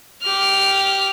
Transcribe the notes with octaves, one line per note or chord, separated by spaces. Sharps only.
G4 F6